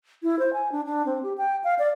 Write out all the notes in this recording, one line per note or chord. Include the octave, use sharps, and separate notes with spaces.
E4
C5
G#5
D4
D4
C4
G4
G5
F5
D5